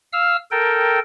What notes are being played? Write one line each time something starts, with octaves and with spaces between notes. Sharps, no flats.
F5 E6 F6
A4 A#4 G5